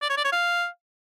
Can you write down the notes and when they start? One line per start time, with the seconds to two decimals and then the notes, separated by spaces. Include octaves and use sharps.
0.02 D5
0.09 C#5
0.17 D5
0.25 C#5
0.32 F5